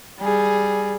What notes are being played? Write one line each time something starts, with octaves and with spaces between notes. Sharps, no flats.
G3 G#4